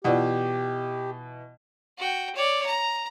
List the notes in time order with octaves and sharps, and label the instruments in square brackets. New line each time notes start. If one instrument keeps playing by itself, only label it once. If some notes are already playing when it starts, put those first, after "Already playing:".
[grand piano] B2 E3 [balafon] F4 D5 F#5 [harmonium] G4
[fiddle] F#4 G5
C#5 D5
A#5